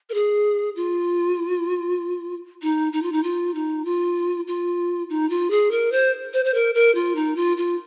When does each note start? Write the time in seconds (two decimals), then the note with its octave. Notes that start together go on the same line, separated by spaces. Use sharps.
0.09 A#4
0.14 G#4
0.75 F4
2.62 D#4
2.92 D#4
3.02 F4
3.12 D#4
3.23 F4
3.54 D#4
3.85 F4
4.47 F4
5.09 D#4
5.30 F4
5.50 G#4
5.71 A#4
5.92 C5
6.33 C5
6.44 C5
6.54 A#4
6.74 A#4
6.94 F4
7.15 D#4
7.36 F4
7.57 F4